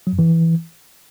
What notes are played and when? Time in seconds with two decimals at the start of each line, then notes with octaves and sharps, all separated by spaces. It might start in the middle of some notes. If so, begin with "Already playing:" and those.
0.07 F#3
0.13 F#2
0.19 E3